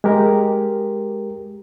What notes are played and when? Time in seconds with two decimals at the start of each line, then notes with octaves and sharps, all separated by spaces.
0.04 G#3 G4 A#4